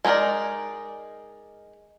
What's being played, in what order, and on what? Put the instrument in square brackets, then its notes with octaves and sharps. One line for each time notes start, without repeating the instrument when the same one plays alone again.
[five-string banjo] G#3 B3 D#4 A#4 D5